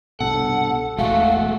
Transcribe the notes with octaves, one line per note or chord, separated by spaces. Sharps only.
C2 G2 B2 A4 F#5
E1 A1 E3 G#3 A3 F#4 F5